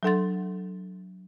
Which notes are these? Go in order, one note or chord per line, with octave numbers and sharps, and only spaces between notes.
F#3 D4 A4 F#5 C6 A6